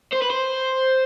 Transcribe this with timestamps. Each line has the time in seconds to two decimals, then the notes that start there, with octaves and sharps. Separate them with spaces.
0.12 C5
0.22 B4
0.30 C5